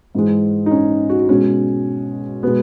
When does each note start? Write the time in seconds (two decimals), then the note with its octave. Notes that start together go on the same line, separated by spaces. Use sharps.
0.15 G#2 E3 G#3
0.66 D#4
0.71 C#4
1.09 F#4
1.29 B2 G#3 C#4
2.43 B2 B3
2.47 G#3